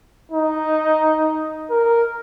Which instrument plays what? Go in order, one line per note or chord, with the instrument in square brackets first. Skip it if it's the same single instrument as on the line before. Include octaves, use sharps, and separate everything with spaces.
[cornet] D#4
A#4